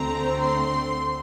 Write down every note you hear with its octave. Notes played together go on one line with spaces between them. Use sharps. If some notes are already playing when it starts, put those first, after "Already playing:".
Already playing: D2 D3 A3 C4 A#5
C6